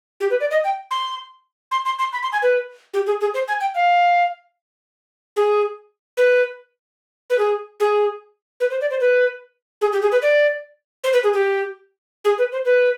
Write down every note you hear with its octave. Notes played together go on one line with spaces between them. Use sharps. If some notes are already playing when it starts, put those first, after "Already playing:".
G4
B4
D5
D#5
G5
C6
C6
C6
C6
B5
C6
G#5
B4
G4
G#4
G#4
C5
G#5
G5
F5
G#4
B4
B4
G#4
G#4
B4
C5
D5
C5
B4
G#4
G4
G#4
B4
D5
C5
B4
G#4
G4
G#4
B4
C5
B4